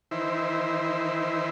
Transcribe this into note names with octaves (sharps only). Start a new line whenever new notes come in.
D#3 E3 E4 C5